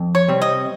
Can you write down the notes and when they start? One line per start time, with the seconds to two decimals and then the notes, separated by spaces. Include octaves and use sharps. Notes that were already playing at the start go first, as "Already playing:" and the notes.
Already playing: F2
0.15 C#5
0.28 C3 G3 C4
0.42 D#5